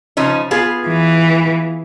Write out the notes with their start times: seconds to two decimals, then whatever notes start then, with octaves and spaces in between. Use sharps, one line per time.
0.17 C#3 F3 D#4
0.51 B3 F4 G#4
0.88 E3